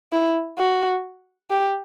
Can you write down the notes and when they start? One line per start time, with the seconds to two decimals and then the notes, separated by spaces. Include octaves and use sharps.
0.12 E4
0.58 F#4
1.50 G4